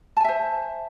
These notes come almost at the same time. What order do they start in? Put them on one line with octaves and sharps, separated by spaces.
A5 G#5 E5 C5